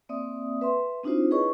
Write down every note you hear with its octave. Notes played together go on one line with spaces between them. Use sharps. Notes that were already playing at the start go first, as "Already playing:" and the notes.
A#3 C4 D5 E5 D#6
B4 E5 C6
C4 D4 D#4 F4 F#4 C5
E4 G#4 B4 C#5 D#5 C#6